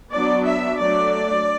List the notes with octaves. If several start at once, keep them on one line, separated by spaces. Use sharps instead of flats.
F#3 B3 D4 D5
E5
F#3 A3 D4 D5